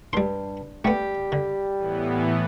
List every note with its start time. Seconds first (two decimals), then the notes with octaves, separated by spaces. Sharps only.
0.13 G2 G3 C6
0.85 G3 A3 B3 G4
1.32 D3
1.76 A2 E3 B3